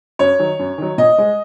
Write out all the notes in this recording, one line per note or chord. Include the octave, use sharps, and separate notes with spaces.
F#2 C#5
D#3 F#3
F#2
D#3 F#3
A#2 D#5
G#3